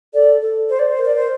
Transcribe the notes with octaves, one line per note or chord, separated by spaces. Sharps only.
A4 D5
A4
C5
D5
C5
A#4
D5
C5